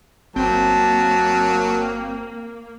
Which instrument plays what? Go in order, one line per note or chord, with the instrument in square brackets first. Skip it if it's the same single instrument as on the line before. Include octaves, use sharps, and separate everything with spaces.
[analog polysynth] G1 C4 G5 [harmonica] F#3 [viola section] A#3 [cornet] A5